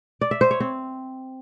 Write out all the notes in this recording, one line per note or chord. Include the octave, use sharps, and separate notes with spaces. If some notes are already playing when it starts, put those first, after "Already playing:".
D5
E5
C5
C#5
C4